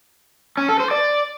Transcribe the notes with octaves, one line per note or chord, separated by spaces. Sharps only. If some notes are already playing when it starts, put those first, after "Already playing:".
C#4
A4
C5
D5